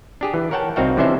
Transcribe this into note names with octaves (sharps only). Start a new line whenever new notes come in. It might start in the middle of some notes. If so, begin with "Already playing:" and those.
D4 G4 G#4
E3
A#4 C#5 F#5 G5 A5
C2 C4 D#4 F#4 F5 G5
C3 E3 C#4 D4 C5 E5